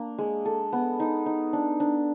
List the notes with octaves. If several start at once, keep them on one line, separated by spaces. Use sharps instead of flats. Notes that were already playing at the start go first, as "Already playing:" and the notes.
Already playing: A#3 D4
G#3
A4
B3
D#4
D#4
D4
D4